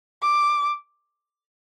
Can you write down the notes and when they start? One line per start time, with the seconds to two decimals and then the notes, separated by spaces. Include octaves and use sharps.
0.22 D6